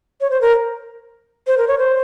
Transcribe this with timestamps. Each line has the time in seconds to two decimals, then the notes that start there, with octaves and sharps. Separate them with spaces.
0.21 C#5
0.30 C5
0.41 A#4
1.47 C5
1.58 A#4
1.68 C#5
1.78 C5